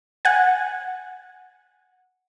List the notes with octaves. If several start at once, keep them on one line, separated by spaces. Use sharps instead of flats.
F#5 G#5